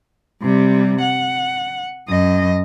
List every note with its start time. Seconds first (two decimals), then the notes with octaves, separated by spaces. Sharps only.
0.42 C3 G3
1.01 F#5
2.09 F#2 D#5